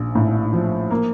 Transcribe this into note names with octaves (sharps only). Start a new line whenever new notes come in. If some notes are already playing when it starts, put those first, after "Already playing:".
Already playing: A#1
A2
F3
A#3